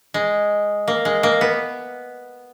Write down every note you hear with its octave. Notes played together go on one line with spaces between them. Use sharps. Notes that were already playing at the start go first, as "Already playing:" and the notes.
G#3
A#3
G#3
A#3
B3